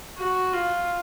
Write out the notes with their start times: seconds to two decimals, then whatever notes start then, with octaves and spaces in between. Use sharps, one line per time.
0.18 F#4
0.54 F4